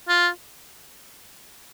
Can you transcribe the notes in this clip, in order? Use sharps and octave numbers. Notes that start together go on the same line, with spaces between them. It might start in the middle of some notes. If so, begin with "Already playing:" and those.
F4